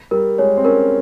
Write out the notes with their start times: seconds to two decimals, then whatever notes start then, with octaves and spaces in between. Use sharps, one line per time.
0.11 G3 A#4
0.38 G#3 C#5
0.57 C4
0.65 C#4 A#4